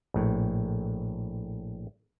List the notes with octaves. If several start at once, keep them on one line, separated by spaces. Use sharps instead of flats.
A#1 A2